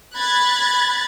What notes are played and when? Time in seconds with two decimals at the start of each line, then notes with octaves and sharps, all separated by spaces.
0.15 B5 F#6 G#6 A6